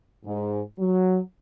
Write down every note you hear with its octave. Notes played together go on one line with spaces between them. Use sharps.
G#2
F#3